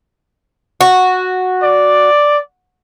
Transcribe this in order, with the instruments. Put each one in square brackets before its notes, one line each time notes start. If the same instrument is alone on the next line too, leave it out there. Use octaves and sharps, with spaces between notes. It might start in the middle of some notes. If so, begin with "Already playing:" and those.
[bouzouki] F#4
[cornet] D5